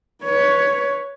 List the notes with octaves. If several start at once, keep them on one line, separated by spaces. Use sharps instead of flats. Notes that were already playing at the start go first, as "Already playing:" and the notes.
B4 C#5